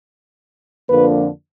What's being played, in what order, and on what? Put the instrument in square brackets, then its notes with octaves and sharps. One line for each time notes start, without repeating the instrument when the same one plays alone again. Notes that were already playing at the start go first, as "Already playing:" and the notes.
[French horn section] F2 D3 F3 A#3 D4 B4